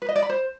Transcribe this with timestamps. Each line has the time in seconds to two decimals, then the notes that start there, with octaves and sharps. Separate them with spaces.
0.02 B4
0.09 D#5
0.16 D5
0.23 B5
0.29 C5